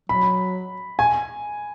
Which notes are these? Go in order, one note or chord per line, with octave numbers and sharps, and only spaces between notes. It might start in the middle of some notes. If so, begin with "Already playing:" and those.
F#3 B5
G#5